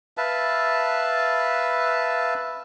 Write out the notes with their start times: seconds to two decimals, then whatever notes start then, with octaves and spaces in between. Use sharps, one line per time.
0.17 B4 E5 F5 A5